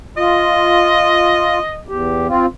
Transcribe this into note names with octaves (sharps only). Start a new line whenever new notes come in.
F4 D#5
E2 G4
C4 F4